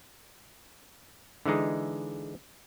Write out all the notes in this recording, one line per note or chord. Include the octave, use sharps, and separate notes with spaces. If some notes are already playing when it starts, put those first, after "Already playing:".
D3 E3 G#3 D#4 G#4